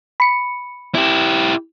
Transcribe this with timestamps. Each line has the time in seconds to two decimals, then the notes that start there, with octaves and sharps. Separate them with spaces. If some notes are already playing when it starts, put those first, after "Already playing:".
0.20 B5 C#7
0.95 E4 G4